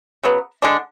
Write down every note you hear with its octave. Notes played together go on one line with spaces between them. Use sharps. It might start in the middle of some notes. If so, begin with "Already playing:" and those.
C#3 F#3 B3
D3 G#3 D4